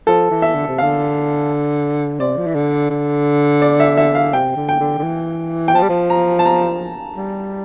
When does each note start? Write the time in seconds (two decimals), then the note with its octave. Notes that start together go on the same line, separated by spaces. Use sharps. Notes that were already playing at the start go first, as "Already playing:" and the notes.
0.07 F3 A4
0.31 E3
0.42 E5
0.55 D3
0.68 C3
0.78 D3 F5
2.20 C3 D5
2.37 F3
2.47 E3
2.55 D3
2.90 D3
3.62 D5
3.80 E5
3.97 E5
4.15 F5
4.33 C3 G5
4.56 D3
4.69 G5
4.80 D3
4.98 D3
5.04 E3
5.68 G5
5.74 F3 A5
5.82 G3
5.89 F3
6.10 A#5
6.39 A5
6.45 A#5
7.16 G3